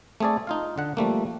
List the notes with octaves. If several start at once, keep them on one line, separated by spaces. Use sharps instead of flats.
A3 C4 G#4 A4 D5
D#4 F4 F5
D3 F#5
F3 G3 A3 A#3